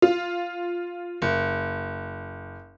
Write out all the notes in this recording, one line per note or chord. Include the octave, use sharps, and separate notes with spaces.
F4
F#1